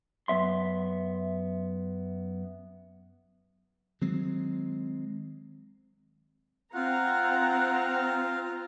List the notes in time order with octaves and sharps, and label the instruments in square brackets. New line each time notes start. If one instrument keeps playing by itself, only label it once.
[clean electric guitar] F#2 B3 E5 C6
[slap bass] D#3 F#3 G#3 C4
[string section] C4 A#5 [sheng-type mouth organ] F4 [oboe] F#5